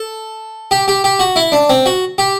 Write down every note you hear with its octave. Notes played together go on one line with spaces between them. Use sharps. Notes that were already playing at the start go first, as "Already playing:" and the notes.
Already playing: A4
G4
G4
G4
F#4
E4
D4
C4
F#4
G4